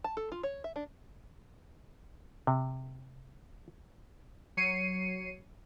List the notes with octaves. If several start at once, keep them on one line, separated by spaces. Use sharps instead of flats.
A5
A4
F4
C#5
E5
D4
C3
F#3 C#5 C7 C#7 D#7